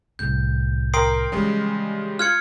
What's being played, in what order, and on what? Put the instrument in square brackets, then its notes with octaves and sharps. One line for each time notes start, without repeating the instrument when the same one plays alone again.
[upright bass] C2 A2 [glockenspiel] G6
[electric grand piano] A#4 G5 D7 [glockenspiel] C6 D#6 C7
[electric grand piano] C#3 G3 G#3 [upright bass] E3 F3
[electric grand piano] F4 F#6 [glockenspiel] F6 G#6 C#7